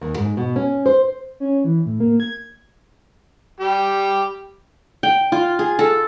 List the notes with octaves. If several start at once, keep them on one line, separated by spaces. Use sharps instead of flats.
D#2
G#2
B2
C#4
C5
C#4
E3
A2
A#3
G#6
G3 G4
G5
F4
G#4
A4